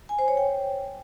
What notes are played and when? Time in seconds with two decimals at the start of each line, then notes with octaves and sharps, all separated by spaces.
0.09 G#5
0.19 C5
0.28 C#5
0.37 G5